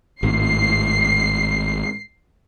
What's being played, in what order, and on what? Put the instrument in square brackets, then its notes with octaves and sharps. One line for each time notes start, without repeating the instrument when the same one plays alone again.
[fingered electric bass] G#1 A2 [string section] C7